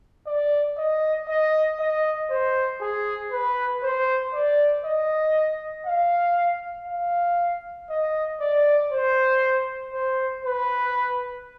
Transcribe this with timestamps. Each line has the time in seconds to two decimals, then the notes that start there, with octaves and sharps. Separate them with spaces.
0.27 D5
0.78 D#5
1.28 D#5
1.80 D#5
2.30 C5
2.82 G#4
3.32 B4
3.83 C5
4.34 D5
4.84 D#5
5.86 F5
6.88 F5
7.90 D#5
8.40 D5
8.92 C5
9.93 C5
10.45 B4